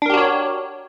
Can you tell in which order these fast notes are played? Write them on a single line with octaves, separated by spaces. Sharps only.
D4 A#4 G4 F#4 C#5